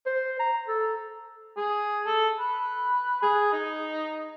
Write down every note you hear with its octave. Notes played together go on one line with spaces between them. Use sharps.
C5
A#5
A4
G#4
A4
B4
G#4
D#4